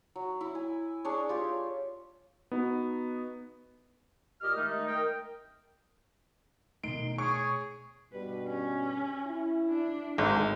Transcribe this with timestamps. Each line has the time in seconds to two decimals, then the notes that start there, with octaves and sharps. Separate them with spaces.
0.16 F#3
0.41 E4
0.55 G#5
1.05 D4 G#4 C#5
1.29 F4 G4 C#5
2.52 B3 D#4 F#4
4.40 A#2 G4 D#5 F6
4.56 D#3 G#3 A3 D#4
4.86 A#4 D#5 G5
6.84 B2 D#3 A3 D#4 C6 D7
7.18 G#4 C#5 C#6
8.13 G2 B2 G3 B4
8.48 C#4
9.26 E4
9.69 D4
10.18 G#1 D2 G#3